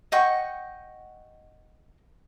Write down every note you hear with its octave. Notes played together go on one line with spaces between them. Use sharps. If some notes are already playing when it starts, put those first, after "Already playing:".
D#5 F#5 G5 C#6